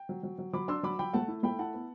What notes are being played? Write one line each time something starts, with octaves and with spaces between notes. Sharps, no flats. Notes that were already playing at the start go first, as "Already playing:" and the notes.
Already playing: G5
F#3
F#3
F#3
F#3 B5 D6
D4 C6 E6
F#3 B5 D6
F#3 G5 B5
A3 F#5 A5
E4
A3 G5 B5
E4 F#5 A5
B3